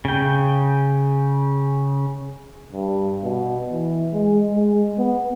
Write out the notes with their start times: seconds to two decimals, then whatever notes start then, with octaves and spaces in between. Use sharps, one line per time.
0.05 C#3 G5
2.73 G2
3.23 B2
3.72 E3
4.13 G#3
4.56 G#3
4.98 B3